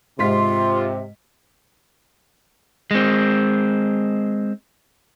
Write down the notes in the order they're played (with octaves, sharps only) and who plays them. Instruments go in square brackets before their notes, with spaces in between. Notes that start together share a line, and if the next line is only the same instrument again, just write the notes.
[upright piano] G#2 B6 [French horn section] C3 [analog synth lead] F4 [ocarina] C6
[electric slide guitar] G#3 C4